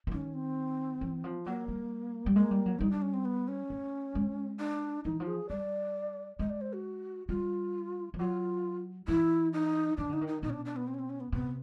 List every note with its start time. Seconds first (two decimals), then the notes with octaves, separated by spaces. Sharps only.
0.07 E3
0.12 D#3 C#4
0.34 C4
1.01 E3
1.24 F3
1.46 F#3 A#3
1.68 G3
2.26 G3
2.36 G#3 A#3
2.51 G3
2.66 F#3
2.79 G3 D#4
2.91 D4
3.02 C#4
3.14 C4
3.25 B3
3.48 C#4
3.70 A3
4.15 G#3
4.60 D4
5.05 E3 D#4
5.20 F3
5.27 G#4
5.49 G3 D5
6.39 G#3 D#5
6.50 D5
6.61 C5
6.73 F#4
7.29 G3 F4
8.14 F3
8.19 F#3 F4
9.08 E3 E4
9.53 D#4
9.98 D#3 D4
10.10 D3 D#4
10.21 D#3
10.27 D#4
10.42 B2 D#4
10.50 C#4
10.53 D4
10.65 D4
10.76 B3
10.88 C4
10.94 C#4
10.99 C4
11.10 C#4
11.20 B3
11.32 C3 B3